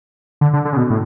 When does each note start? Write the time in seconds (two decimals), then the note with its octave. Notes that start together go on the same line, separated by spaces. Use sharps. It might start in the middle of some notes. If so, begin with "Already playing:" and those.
0.41 D3
0.53 D3
0.65 D3
0.73 C#3
0.77 B2
0.90 A2